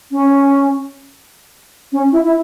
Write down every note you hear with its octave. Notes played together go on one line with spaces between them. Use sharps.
C#4
C#4
E4
E4